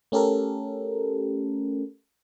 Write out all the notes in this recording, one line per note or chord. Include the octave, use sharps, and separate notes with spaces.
A3 C#4 G4 A4 A#4